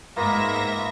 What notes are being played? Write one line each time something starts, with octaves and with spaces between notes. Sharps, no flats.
G#2 A#3 B3 F4 E5 A#6